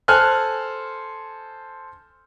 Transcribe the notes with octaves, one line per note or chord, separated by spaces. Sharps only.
A4 C5 G#5 F6 F#6